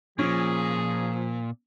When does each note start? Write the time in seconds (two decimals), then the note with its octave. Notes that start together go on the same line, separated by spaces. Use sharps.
0.19 A#2 F3 C#4 G#4